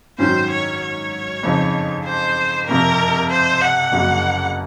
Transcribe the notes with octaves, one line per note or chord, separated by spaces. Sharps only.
G#2 D#3 F#3 C#4 C5
C#5
C#5
F2 C#3 F3 C4 D#4
C5
F2 C3 F3 A#4
C5
F#5
F#1 F2 C#3 F#3 A#3